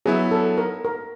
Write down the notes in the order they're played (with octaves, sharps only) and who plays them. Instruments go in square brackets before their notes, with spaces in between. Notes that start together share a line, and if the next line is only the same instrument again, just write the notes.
[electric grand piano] F#3 B3 E4 [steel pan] G#4
[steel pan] A4
A#4
A#4